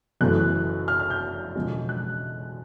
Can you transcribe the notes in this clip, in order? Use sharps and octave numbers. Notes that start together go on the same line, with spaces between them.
F#1 F#2 C#3 E3 A3 F#6
F6
F6
G6
E1 D2 C#3 F3 G#3
F#6